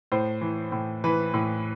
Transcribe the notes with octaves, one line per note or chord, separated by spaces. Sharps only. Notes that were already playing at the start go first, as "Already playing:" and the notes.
A2 C5
E3
A2
E3 B4
A2